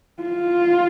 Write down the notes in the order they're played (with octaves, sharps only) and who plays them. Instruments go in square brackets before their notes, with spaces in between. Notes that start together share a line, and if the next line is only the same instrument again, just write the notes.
[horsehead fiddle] F4